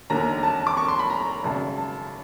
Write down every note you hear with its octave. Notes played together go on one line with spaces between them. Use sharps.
E1 D#2 D3 A#5
A5
D6
C#6
C6
B5
A#5
G#1 F#2 C#3 A5
A5